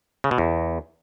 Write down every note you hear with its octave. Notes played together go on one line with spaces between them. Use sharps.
C#3
B2
E2